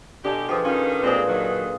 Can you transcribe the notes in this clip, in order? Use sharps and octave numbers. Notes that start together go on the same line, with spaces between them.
B2 D3 G4 D#5 G#5
F3 G4 G#4 B4
D#3 C#4 F4
A#2 G3 G#3 C4 G#4
D3 D#3 F#3